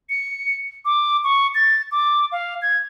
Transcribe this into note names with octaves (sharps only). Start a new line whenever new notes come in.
C#7
D6
C#6
A6
D6
F5
G#6